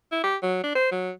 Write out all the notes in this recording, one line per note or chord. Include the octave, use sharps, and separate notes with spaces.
E4
G4
F#3
D4
C5
F#3